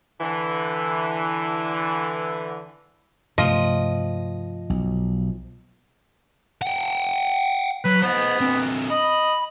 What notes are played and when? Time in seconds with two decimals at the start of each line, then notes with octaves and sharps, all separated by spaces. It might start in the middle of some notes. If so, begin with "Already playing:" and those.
0.21 D3 E3
3.38 G2 C3 F3 A3 D#5
4.70 B1
6.62 F#5 G5
7.85 F#3 B4
8.02 B3 C5 D#5
8.41 D3 C4
8.91 D#5 B5